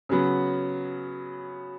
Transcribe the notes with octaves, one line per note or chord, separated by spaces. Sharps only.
C#3 F#3 B3